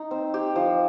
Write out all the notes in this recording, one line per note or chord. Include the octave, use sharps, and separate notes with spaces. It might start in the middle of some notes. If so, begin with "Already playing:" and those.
Already playing: D#4
C4
G4
F3